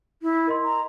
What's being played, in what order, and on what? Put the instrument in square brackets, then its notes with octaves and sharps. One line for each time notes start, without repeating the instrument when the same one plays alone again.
[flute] E4
[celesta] A#4 D#5 C6
[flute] A#5